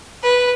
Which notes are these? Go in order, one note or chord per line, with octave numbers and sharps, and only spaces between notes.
B4